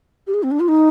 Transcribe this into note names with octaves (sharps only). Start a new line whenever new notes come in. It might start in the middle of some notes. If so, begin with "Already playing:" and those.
G4
G#4
C4
D4
F4
D#4